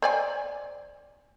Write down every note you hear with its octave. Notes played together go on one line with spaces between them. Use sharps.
C5 D5 G#5